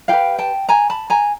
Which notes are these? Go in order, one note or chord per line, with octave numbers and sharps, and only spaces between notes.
E4 G4 B4 F5 G5
G5 A5
G#5 A#5
A5 B5
G#5 A#5